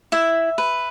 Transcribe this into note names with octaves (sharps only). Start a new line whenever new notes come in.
E4 E5
B4